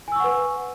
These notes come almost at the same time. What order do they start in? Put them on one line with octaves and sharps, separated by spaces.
G#5 E6 C#6 F#5 B4